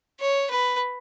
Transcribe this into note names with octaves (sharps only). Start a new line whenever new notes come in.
C#5
B4